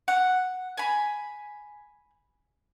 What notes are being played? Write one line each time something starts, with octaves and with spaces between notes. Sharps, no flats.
F#5
G#5 B5